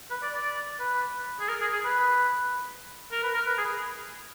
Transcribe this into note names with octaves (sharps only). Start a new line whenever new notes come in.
B4
D5
D5
B4
G#4
A#4
G#4
G#4
B4
A#4
B4
A#4
B4
G#4